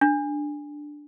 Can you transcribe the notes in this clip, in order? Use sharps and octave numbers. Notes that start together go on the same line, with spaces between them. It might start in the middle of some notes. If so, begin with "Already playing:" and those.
D4